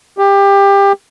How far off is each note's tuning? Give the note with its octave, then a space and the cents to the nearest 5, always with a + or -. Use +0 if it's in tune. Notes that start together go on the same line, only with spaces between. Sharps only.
G4 +20